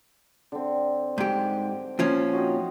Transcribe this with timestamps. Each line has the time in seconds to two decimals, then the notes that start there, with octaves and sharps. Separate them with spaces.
0.52 D3 C4
1.18 G#2 G4 G5
1.99 A#2 F3 C#4
2.33 C4 D#4 F#4